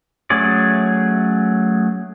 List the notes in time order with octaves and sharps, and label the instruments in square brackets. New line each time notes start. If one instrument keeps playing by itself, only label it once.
[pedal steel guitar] F#3 A3 C#4 G#4 D5